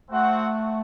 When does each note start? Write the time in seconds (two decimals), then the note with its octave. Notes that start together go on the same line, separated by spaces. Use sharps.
0.10 A3 C4 F#4 C5 F#5